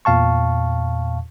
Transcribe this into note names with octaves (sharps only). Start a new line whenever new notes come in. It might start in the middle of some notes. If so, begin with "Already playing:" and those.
E2 A#2 F5 A5 C#6